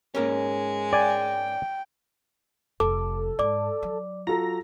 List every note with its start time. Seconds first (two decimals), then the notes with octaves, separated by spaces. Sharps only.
0.15 G#2 G#3 A#3 C#4
0.93 D5 G5 G#5
2.80 F1 A4 D6
3.39 G#2 D5 D6
3.82 F#3
4.27 F4 F#4 A4 A#5 A#6